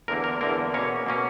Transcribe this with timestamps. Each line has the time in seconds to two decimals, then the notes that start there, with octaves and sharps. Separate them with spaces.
0.08 E2 D3 A#3 A#4
0.24 A#4
0.41 E2 D3 A#3 A#4
0.73 B2 A#3 C#4 C#5
1.07 B2 A#3 C#4